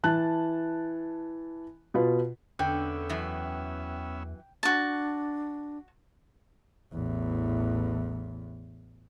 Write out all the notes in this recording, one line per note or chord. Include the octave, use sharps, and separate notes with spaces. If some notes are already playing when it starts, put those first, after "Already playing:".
E3 A5 F#6
B2 F4 B4
E2 D3 B3 C#4 E5 G5
F#2 E3
D4 F#4 A5
A1 E2